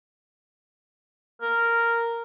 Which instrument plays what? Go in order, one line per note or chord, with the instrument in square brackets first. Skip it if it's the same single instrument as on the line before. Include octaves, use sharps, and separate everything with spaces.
[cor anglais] A#4